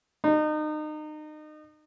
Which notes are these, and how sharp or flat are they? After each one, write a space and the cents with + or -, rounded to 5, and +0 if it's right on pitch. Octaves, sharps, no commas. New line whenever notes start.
D#4 -30